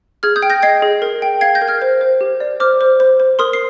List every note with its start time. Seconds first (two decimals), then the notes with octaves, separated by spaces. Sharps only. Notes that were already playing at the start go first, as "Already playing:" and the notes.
0.23 G#4 F6 G#6
0.36 D#6 G6
0.43 G5
0.50 G6 A#6
0.62 D#5 G#6 C7
0.82 G#4
1.02 A#4
1.22 G5
1.41 F5 G#6 C7
1.55 G6 A#6
1.62 A#4
1.68 F6 G#6
1.82 C5
2.01 C5
2.21 G4
2.40 D5
2.60 C5 D6 F6
2.81 C5
3.00 C5
3.20 C5
3.39 A#4 C6 D#6
3.53 C7